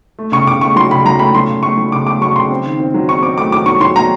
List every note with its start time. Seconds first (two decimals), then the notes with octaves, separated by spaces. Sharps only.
0.19 A3
0.32 C#3 C#6
0.47 C#3 D6
0.61 A3 C#6
0.76 F#3 C6
0.91 C#3 B5
1.05 F#3 A#5
1.19 A3 B5
1.35 F#3 C6
1.49 C#3
1.63 A3 C#6
1.77 F#3
1.92 C#3 D6
2.06 A3 D6
2.21 F#3 C#6
2.35 C#3 C6
2.51 C4
2.64 D#3
2.80 C4
2.94 F#3
3.08 C4 C#6
3.22 C4 D6
3.38 A3 D6
3.52 F#3 D6
3.66 F#3 C#6
3.81 F#3 C6
3.96 F#3 A#5